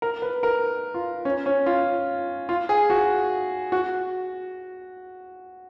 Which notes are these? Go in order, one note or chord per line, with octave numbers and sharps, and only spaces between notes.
A#4
B4
A#4
F4
C#4
C#4
F4
F4
G#4
F#4
F#4